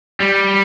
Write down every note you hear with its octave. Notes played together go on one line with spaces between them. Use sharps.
G3